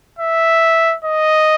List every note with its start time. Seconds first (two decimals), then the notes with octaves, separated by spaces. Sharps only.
0.19 E5
1.04 D#5